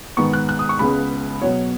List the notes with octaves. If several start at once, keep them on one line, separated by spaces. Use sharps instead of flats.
G#2 D#3 B3 C#6
F#6
F#6
D#6
C#6
C#2 C#3 G#3 B3 B5
B2 F#3 B3 C#5